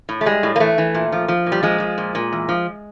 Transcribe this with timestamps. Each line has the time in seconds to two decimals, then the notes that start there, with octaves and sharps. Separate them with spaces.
0.09 A2
0.21 A3
0.26 G3 G#3
0.43 A2
0.56 A#3
0.60 E3 A3
0.78 E3
0.95 A#2
1.12 F3
1.28 F3
1.46 A#2
1.52 G3
1.63 F3 G#3
1.80 F3
1.98 A#2
2.15 A#2
2.32 E2
2.49 F3